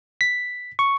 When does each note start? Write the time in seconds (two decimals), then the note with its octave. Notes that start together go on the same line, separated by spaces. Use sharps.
0.21 B6
0.79 C#6